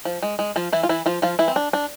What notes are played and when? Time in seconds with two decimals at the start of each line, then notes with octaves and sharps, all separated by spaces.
0.05 F3
0.23 G#3
0.39 G#3
0.56 F3 F4
0.73 E3 E4
0.83 F4
0.89 E3 E4
1.06 F3 F4
1.22 F3 F4
1.39 E3 E4
1.48 C4
1.56 D4
1.73 D4